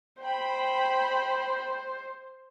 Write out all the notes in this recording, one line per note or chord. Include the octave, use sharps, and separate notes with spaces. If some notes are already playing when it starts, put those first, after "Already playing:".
C5 G5 B5